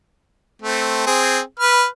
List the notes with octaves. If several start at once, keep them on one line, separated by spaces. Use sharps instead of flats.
A3 C4
C4 G#4
B4 F6